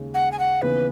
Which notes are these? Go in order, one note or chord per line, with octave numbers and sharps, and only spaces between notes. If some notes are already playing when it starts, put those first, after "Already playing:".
Already playing: D#2 C#3 G#3
F#5
G#5
F#5
D#2 C#3 E3 B3 B4